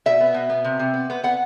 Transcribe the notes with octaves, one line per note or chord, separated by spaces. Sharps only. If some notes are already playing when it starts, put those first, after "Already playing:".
B2 E5
B3
B2
B3
C3
C3
B3
B3
B3 F#5